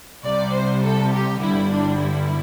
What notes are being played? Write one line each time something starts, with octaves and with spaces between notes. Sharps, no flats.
C2 C3 G3 D5
C5
A4
G4
G1 G2 D3 G3 E4
D4
E4